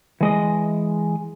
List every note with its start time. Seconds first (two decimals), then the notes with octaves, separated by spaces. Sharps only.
0.21 E3 G#3 D#5